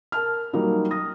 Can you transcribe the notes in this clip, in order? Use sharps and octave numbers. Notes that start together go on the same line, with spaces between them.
A#4 A5 F6
F#3 G3 A#3 D#4
D#6 A#6